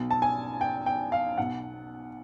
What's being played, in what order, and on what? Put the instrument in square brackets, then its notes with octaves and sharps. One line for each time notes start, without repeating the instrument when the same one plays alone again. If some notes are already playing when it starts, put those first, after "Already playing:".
Already playing: [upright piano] B1 B2
A5
G#5
G5
G5
F5
B1 B2 F#5